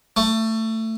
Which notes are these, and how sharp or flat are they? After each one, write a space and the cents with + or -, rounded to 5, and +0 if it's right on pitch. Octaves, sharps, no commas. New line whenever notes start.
A3 +20